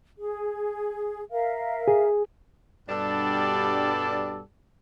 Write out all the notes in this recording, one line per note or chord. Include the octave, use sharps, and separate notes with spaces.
G#4
A#4 E5 F5
G#4
G2 B2 G3 D4 A4 D5